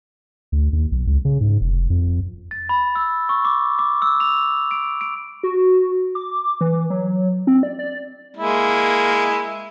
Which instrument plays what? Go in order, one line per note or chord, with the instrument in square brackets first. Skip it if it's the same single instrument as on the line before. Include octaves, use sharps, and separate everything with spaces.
[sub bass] D2
D#2
B1
C#2
C#3
G#2
F1
F2
[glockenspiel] A6
B5
E6
C#6
D6
D6
E6
F7
D7
D7
[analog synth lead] F#4
D6
E3
F#3
C4
D5
D5
[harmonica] G#3 A#3 E4